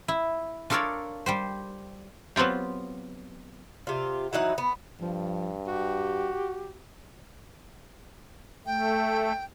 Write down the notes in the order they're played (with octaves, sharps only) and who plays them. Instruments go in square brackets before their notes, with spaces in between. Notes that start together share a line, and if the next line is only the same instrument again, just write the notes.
[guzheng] E4
D4 F4 A4 A#4 C#5 D5
G3 G4 C5
[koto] F#3 B3 C4 F4 G4
[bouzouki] C3 F4
E3 F#3 D#4 F#5
B3
[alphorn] G2 [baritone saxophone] F3
[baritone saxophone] F#4 [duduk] G4
[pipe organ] A3 [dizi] G5